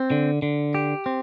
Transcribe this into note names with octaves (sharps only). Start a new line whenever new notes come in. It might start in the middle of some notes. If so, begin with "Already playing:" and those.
Already playing: C4
D3
D3
G4
C4